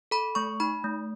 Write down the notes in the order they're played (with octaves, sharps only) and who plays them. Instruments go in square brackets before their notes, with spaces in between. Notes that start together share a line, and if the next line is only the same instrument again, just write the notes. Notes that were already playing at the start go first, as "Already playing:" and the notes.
[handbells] A4 B5
A3 C#6
D#4 B5
A3